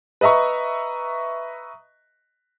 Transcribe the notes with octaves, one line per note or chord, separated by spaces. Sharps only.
B4 D#5 E5 A#5 C#6